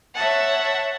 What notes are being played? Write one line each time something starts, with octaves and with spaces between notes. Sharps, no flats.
C#5 E5 F#5 A5